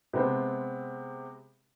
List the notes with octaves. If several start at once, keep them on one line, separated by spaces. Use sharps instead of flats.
C3 G#3 B3 C4